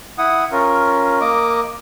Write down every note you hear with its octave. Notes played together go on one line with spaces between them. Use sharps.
E4 F#5 D#6
C#4 F4 A#4
A#3 D#5 D6